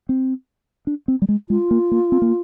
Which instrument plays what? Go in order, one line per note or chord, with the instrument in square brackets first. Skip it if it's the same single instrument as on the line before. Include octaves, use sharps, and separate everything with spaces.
[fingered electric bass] C4
D4
C4
G3
G#3
[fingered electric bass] G#3 [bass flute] F4
[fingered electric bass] A#3
A#3
C4
A#3